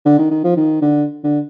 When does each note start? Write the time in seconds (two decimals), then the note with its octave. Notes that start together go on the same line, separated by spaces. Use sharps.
0.05 D3
0.19 D#3
0.31 D#3
0.44 F3
0.56 D#3
0.82 D3
1.24 D3